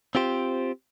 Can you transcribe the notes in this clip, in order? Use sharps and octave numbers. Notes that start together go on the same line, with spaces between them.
C4 F4 G4 C5